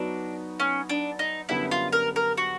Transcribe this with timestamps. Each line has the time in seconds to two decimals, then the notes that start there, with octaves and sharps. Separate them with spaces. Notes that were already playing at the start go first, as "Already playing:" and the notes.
Already playing: F#3 B3 D4 D#4 F#4
0.60 C#4
0.89 D4
1.19 D#4
1.49 F#2 D3 G3 B3 E4
1.71 F4
1.92 A#4
2.16 A#4
2.37 F#4